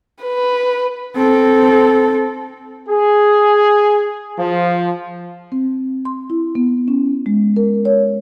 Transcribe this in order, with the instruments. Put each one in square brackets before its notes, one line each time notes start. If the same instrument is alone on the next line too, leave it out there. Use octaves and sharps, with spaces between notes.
[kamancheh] B4
[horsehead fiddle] C4 A4
[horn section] G#4
F3
[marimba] C4
C6
E4
B3
C#4
G#3
A#4
C#5